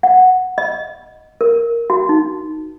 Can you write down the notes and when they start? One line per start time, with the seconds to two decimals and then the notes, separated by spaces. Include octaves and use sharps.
0.03 F#5
0.58 D#5
1.41 A#4
1.90 F#4
2.09 D#4